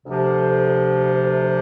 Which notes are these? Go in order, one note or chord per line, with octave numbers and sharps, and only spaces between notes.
D2 C3 F3